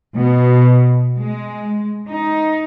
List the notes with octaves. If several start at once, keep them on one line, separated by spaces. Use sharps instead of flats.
B2
G#3
D#4